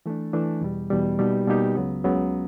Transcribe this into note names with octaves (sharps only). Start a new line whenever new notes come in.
E3 A3 D4
E3 A3 D4
E2 B2 G3
E2 B2 G3
B2 G3 A#3 D#4 G4
B2 G3 A#3 D#4 G4
C#2 C#3 F#3 B3
C#2 C#3 F#3 B3